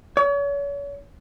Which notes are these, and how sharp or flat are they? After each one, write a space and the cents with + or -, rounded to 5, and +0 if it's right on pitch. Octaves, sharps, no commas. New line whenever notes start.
C#5 +40